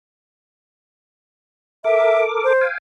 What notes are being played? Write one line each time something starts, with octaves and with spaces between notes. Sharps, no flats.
A4 A#4 E5 D6
C5
F5 G5 G#5